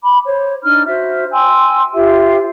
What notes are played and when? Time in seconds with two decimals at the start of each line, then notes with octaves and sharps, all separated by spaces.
0.03 B5 D6
0.25 C5 C#5
0.62 D4 D#4 F6
0.87 F#4 C5 E5
1.31 G5 G#5 C6 E6
1.93 F4 G4 C5 E5